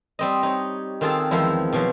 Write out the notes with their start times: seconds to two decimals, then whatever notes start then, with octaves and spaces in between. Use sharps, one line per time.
0.19 G3 C4 D#5
0.43 D#4 C#5
1.01 D#3 C4 F4 G#4 A4 A5
1.31 E2 D#3 F3 G#3 E4
1.73 B2 F3 F#3